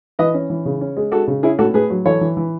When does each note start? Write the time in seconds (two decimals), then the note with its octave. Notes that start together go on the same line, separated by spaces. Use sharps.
0.19 E3 B4 D#5
0.34 C#4
0.50 E3
0.65 C#3
0.81 C#4
0.97 G#3
1.12 G#3 F#4 A4
1.27 C#3
1.43 C#4 E4 G#4
1.59 A2 F#4 A4
1.74 A2 G#4 B4
1.90 F#3
2.06 E3 A4 C#5
2.21 E3
2.37 E3